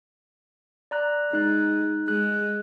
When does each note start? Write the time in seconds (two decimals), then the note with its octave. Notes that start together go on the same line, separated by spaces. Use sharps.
0.91 D5 A#5 F#6
1.33 G#3 D#4 F#6
2.08 G#3 F#6